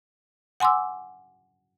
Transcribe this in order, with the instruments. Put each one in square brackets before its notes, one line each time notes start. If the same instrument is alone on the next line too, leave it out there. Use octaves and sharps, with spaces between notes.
[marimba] F#5 G#5 C6 D6 E6